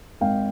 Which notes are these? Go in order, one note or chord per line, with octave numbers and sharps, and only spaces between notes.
G#1 F5 G5